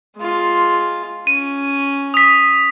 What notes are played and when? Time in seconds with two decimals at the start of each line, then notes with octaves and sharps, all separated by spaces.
0.16 G#3 F4
1.27 C#4 D#7
2.14 D#6 B6